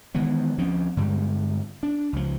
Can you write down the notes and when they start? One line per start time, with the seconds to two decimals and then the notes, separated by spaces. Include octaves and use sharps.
0.15 D#3 E3 G#3 B3
0.58 D2 F3 C4 C#4
0.97 G2 D3 G3 G#3
1.83 D4
2.13 C#2 F3